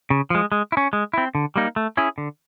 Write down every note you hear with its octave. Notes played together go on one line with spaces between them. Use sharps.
C#3
F3 G#3
G#3
E4
C#4
G#3
C4 E4
D3
G3 A#3 D#4
A3
C#4 E4 G#4
D3